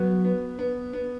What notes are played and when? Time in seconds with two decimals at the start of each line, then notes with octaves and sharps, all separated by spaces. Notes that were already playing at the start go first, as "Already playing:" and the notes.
Already playing: F#3 B3
0.25 B3
0.59 B3
0.93 B3